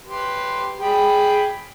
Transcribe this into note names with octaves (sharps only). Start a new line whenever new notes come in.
G4 B4 C6
G#4 G5 B5